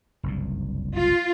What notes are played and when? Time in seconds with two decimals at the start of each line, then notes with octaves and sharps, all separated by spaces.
0.23 F#1 C2 G2
0.96 F4